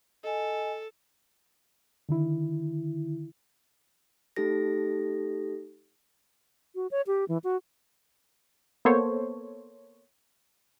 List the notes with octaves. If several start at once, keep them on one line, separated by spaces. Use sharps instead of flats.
A4 D#5 G#5
D3 D#3 E4
A3 D#4 G4 A4 A#6
F#4
C#5
G4
E3
F#4
A#3 B3 A4 C5 C#5